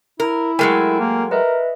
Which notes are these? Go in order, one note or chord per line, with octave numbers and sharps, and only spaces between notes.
E4 A#4
F#3 G#3 A3 A#4 G5 G#5
A#3
A#4 B4 D#5 E5